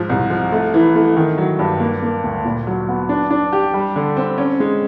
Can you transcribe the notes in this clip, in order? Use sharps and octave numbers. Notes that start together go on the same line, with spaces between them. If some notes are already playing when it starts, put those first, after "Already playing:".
Already playing: G#2 F3
C2
F3
A3
E3
A3
D#3
F#3
G2
A#3
A#3
D2
A#2
F#3
B3
D4
D4
G4
G3
D3
C4
C#4
G#3